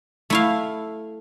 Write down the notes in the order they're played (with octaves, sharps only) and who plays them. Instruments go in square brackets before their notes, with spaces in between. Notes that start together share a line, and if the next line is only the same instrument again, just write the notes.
[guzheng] A3 E4 F5